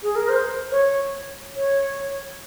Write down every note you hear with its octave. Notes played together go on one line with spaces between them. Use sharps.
G#4
A#4
C5
C#5
C#5